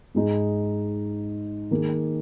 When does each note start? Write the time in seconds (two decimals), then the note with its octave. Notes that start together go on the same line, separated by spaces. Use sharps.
0.15 G#2 G#3 D#4 G#4
1.71 D#3 A#3 D#4 G#4